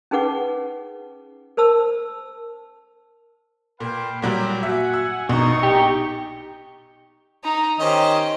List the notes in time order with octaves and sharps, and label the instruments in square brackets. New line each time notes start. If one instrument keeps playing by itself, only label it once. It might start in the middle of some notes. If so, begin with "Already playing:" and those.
[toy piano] C#4 D#4 G#4 B4 F#5 D6
A#4 C5 A5 E6
[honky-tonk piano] A#2 [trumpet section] B4 F5 G5
[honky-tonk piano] A#2 F#3 G3 [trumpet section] G4
[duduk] F#4 [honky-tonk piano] E5 [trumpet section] F#5 G#5
[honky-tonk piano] E6
[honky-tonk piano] A#1 [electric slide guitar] B2 [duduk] D#4 [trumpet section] C#6
[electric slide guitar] G4
[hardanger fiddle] D#4 A#5
[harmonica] D#3 C#4 D#5 [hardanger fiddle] G4 C5